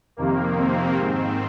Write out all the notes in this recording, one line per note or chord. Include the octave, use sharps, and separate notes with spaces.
F2 C3 D#3 A#3
C4
G#2 D#3